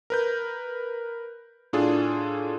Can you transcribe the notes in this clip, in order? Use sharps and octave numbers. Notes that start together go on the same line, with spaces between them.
A#4 B4 G6
A2 D4 F4 G#4 A4